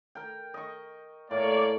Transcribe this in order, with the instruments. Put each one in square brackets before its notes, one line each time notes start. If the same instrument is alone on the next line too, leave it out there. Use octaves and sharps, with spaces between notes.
[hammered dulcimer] A#4 G5
D#5 C#6
[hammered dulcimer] A2 [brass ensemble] A#3 C#5 D5